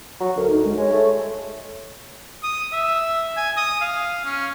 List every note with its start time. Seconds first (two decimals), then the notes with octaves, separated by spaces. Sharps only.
0.20 F#3
0.36 D2 A#4
0.50 D#4
0.64 G#3
0.77 G#3 C#5
0.92 A3
2.43 D#6
2.72 E5
3.37 G#5
3.57 D#6
3.82 F5
4.25 C#4